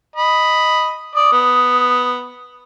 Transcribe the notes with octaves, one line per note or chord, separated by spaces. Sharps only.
D#5 B5
D5 D#6
B3